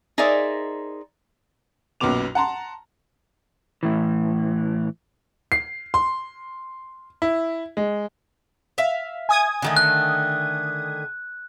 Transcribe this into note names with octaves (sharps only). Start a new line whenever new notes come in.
D#4 G#4 A#4 C5 D5 E5
B1 F#2 A#2 B3 D6 F7
F#5 A5 A#5 C6
A2 E3
C7
C6
E4
G#3
E5 F5
G#5 D#6 G#6
D3 D#3 A3
F#6